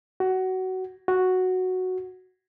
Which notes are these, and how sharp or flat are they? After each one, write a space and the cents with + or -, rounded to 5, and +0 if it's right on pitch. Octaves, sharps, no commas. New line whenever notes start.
F#4 +20
F#4 +0